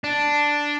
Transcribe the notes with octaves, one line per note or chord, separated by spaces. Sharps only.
D4